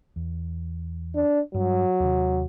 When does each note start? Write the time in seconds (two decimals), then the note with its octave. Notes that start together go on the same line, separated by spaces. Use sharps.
0.16 E2
1.15 D4
1.54 G2 F#3 G3
2.00 D#2 C3